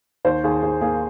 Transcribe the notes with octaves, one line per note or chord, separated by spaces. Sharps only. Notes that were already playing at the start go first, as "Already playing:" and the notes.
D#2 C5
D#2 G#4
D#2 G#4
A#3 G#4